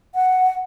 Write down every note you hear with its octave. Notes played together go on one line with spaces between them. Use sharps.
F#5